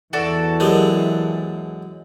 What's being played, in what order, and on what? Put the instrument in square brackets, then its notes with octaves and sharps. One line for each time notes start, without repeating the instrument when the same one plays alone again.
[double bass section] E2 E3 [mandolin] F#4 A4 D5
[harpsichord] F#2 G#3 [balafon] G4 A#4